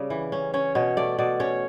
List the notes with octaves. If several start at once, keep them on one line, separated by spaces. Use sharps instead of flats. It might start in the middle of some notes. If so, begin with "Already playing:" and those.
Already playing: C#3 G3 C#4
E3
C#4
C#4 C#5
B2 C#5
A3 D5
B2 D5
C#4 C#5